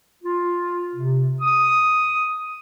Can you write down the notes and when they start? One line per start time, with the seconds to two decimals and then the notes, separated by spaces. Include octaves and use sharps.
0.23 F4
0.95 C3
1.40 D#6